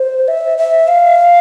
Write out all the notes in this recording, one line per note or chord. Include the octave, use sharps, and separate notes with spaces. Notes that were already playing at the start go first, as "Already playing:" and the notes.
Already playing: C5
E5
E5
F5